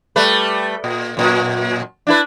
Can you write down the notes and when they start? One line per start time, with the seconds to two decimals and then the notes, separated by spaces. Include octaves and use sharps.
0.16 G3 A3 B4
0.84 A#2
1.17 F#2 A#2
2.07 D4 E4 B4